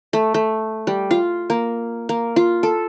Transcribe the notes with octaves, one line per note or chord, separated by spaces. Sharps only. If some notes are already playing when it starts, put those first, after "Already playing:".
A3
A3
G3
F4
A#3
A#3
F4
A4